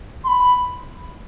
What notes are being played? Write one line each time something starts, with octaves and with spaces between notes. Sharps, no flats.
C6
B5